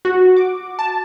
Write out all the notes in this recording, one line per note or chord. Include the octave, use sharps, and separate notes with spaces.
F#4
D6
A5